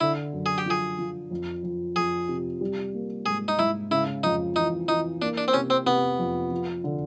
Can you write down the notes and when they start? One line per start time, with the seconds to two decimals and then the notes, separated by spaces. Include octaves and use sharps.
0.01 D3 E4
0.33 F#2
0.46 G#4
0.58 G4
0.66 F3 G#4
0.98 F3
1.31 F2
1.63 F2
1.96 F2 G#4
2.29 C3
2.61 G3
2.94 A#3
3.26 G#2 G#4
3.48 D#4
3.59 G#2 E4
3.91 C#3 E4
4.23 F2 D#4
4.56 E3 D#4
4.88 E3 D#4
5.21 A#3 D4
5.38 D4
5.48 C4
5.54 C3 C#4
5.70 C4
5.86 C3 B3
6.19 F2
6.51 F3
6.84 D3